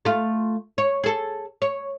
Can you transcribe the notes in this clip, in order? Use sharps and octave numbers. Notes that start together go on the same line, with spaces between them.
A3 F4
C#5
G#4 A4
C#5